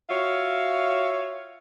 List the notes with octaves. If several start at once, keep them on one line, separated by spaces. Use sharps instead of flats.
F4 F#4 C#5 E5 F5